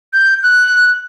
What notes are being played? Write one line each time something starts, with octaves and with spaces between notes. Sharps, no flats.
G6
F#6